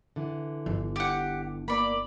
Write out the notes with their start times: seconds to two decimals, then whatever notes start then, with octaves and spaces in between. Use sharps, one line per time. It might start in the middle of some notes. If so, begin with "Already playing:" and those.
0.16 D3 E3
0.66 G1
0.96 G4 F#5
1.68 A#3 D5 B5